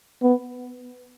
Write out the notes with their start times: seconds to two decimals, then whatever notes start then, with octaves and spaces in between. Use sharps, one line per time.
0.22 B3